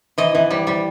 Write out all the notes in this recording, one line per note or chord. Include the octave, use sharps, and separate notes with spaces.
E3 D#5
E3
G3
G3